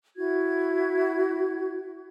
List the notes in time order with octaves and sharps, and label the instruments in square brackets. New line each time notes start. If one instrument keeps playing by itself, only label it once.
[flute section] E4 F#4 G#6